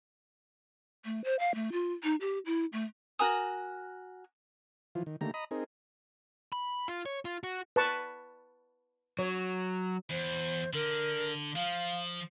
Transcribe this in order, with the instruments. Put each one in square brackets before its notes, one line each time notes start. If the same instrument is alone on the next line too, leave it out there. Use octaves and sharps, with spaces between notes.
[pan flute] A3
C5
F5
A3
F4
D#4
G4
E4
A3
[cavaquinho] F#4 A#4 G#5 D#6
[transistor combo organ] E3 F3 F4
D#3
D3 D#3 A3 A#3 G4 A#5
D#5 A#5 B5 D#6
C4 D#4 G#4 A#4
[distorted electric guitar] B5
F4
C#5
F4
F#4
[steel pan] B4 A5 C#6
[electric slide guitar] F#3 [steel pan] C#5
[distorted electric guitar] E2 [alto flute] C5
[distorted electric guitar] D3 [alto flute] A#4
[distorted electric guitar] F3 [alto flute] F5